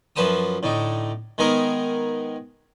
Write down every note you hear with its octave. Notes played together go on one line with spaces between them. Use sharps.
F#2 F3 B4 C5 A5 D#6
A2 D3 D#4
D#3 G#3 B3 D#4 G#4 A#4